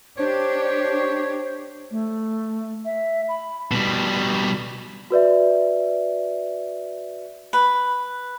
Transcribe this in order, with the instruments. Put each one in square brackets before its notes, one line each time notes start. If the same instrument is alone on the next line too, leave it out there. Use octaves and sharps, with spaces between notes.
[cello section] D4 G4 [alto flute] C5 [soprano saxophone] C#5
[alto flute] A3
E5
B5
[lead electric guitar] B2 G3
[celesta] F#4 B4 D5 E5
[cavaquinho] B4